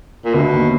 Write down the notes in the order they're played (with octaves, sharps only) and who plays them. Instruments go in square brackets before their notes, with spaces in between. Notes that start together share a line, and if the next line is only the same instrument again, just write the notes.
[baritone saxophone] A#2
[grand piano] D2 D3 [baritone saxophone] B2
[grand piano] D#2 D#3